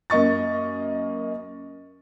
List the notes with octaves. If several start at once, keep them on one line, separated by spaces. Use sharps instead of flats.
F#2 A#3 D#5 C#6 A6